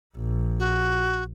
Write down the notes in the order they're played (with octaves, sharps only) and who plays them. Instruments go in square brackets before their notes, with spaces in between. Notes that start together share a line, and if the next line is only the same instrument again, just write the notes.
[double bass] A#1
[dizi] F#4